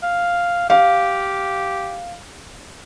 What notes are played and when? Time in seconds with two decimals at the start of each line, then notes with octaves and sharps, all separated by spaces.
0.03 F5
0.70 G4 F5